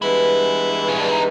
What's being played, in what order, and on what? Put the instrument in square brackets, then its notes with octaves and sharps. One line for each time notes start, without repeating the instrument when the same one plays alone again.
[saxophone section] G2 E3 G#3 B3 [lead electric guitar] E4
[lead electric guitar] C#4
D4
D#4